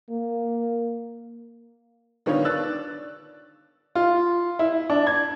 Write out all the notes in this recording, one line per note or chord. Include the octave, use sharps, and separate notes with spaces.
A#3
D3 D#3 B3 D#4 F4 C#5
D5 E6 F#6 A6
F4
E4
D4
G#6